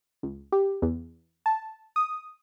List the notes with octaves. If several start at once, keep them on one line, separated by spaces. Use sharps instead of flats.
C#2
G4
E2
A5
D#6